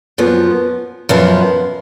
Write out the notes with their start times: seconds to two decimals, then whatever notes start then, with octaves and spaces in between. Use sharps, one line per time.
0.18 F#2 F3 B3
1.09 F#2 F3 B3